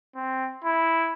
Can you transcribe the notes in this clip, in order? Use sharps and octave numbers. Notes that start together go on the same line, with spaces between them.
C4
E4